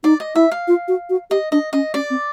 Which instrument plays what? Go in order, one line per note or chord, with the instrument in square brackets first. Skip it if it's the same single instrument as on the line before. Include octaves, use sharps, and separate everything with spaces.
[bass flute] D#4 [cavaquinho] D5
[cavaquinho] D#5
[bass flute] E4 [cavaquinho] E5
[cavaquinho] F5
[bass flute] F4
F#4
F#4
[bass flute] G4 [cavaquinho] D#5
[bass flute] D4 [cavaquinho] D#5
[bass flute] C#4 [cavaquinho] D#5
[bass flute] C#4 [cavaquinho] D5
[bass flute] C4